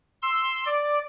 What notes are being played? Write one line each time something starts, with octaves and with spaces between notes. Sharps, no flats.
C6 E6
D5